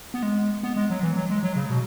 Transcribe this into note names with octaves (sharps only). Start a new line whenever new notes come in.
B3
G#3
B3
G#3
F#3
E3
F#3
G#3
F#3
C#3
B2